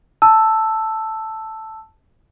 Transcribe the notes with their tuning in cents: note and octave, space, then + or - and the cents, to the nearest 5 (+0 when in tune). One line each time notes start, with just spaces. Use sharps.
A5 +5 E6 +0